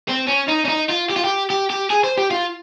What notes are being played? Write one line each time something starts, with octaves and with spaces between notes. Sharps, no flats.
C4
C#4
D#4
C#4
D#4
F4
G4
F4
G4
G4
G4
G#4
C5
G4
F4